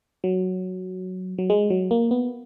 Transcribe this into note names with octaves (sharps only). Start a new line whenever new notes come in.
F#3
F#3
G#3
F#3
A#3
B3